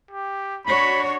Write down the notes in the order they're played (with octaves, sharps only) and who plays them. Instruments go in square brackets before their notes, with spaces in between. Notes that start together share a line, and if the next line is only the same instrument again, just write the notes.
[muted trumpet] G4
[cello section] D4 F#4 C#5 [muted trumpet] B5